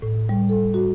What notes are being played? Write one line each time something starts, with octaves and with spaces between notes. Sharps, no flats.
A2
G3
A4
F#4